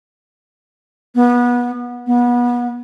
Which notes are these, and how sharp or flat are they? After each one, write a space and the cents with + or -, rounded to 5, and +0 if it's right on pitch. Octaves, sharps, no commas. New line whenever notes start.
B3 -25
B3 -30